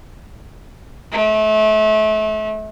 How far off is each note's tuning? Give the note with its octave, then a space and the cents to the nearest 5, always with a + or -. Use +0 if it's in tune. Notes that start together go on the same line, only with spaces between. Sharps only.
A3 -35